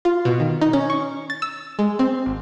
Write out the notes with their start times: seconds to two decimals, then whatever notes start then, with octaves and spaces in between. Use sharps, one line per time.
0.05 F4
0.25 B2
0.40 D#3
0.62 D#4
0.73 C#4
0.90 C#6
1.30 A6
1.42 E6
1.79 G#3
1.99 C4
2.26 G#1